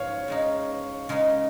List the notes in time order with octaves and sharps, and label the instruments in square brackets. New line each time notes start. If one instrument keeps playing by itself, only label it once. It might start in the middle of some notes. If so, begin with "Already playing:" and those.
Already playing: [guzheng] G#2 F3 C#4 [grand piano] C#5 F5
[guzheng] C#3 G#3 D#4
C#3 G#3 D#4